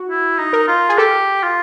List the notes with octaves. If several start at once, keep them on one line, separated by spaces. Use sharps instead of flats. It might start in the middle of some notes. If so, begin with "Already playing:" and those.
Already playing: F#4
E4
D#4
A#4
F4
G#4
G4 A4
F4